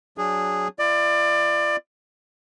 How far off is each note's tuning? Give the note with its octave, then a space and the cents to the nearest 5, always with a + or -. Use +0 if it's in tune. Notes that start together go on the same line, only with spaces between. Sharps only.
F#3 +0 D4 +0 G#4 -10
F4 -45 D5 +25